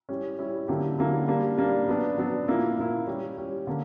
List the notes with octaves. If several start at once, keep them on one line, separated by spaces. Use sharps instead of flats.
G3 C#4 E4 G4
G3 C#4 E4 G4
D3 F#3 A#3 E4 G4
D3 F#3 A#3 E4 G4
G3 A#3 D4
G3 A#3 D4
F#3 B3 D4
F#3 B3 D4
A#2 A#3 E4
A#2 A#3 E4
G3 C#4 G4
G3 C#4 G4
D3 A#3